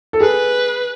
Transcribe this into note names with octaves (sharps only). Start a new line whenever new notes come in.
A4
G#4 B4